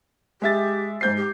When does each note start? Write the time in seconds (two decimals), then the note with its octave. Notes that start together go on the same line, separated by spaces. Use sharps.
0.42 G#3 G4 E5 A6
1.01 G#2 C5 G6 C7
1.17 G4